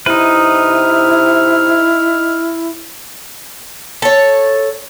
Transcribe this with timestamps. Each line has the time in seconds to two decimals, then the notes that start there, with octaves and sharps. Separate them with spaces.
0.06 C3 D#4 E4 B4 F6
4.02 A4 C#5